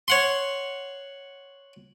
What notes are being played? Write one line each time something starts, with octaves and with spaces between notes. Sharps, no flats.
C#5 F#5 C6